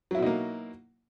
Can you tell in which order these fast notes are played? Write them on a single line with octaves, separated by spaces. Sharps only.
F#3 E4 B2 D#4 A#3